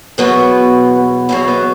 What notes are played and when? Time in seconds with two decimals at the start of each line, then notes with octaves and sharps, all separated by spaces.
0.18 E2 B2 F#3 B3
1.29 E2 B2 F#3 E4
1.48 B3